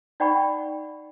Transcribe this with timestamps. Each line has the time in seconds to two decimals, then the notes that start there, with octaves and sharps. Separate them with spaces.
0.20 D#4 D5 F#5 G5 B5 C#6